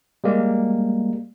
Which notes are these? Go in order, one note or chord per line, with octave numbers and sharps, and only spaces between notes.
G3 G#3 A#3